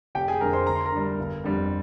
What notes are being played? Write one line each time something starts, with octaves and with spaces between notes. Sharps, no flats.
F1 G4 G5
G#4 G#5
F2 D3 G#3 A#4 A#5
C5 C6
D2 A#5
C6
A#4 A#5
D3 G3
G1
F2 D3 G3